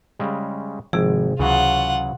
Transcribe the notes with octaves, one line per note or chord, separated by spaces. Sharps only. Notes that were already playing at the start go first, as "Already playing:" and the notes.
C#3 G3 G#3
G#1 C3 F3 G#4
C#2 C#3 E3 F#3 F4 F#5